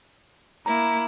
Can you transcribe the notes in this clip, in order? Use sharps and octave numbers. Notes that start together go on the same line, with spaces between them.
A#3 E4 A#5